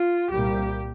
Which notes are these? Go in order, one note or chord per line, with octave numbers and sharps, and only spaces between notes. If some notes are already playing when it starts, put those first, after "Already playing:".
Already playing: F4
C2 A#2 G3 A#3 G4